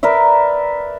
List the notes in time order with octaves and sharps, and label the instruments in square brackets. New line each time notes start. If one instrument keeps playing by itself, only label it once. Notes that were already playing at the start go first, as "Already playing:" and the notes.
[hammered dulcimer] A#4 B4 D5 E5